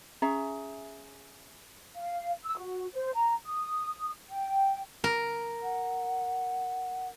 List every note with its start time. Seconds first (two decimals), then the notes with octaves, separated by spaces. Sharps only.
0.22 C#4 G#4 E5 A#5
1.95 F5
2.44 E6
2.57 F#4
2.93 C5
3.14 A#5
3.46 D#6
4.31 G5
5.04 A#4
5.63 F#5